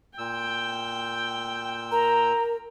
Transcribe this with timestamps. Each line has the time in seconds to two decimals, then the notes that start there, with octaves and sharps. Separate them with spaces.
0.18 A#2 G5 E6
1.91 A#4 A#5